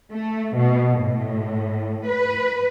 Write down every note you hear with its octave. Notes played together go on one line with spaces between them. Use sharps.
A3
B2
A2
B4